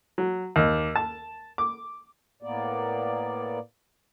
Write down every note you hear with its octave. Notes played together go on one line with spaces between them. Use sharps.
F#3
D#2
A5
D6
A2 A#3 B3 D5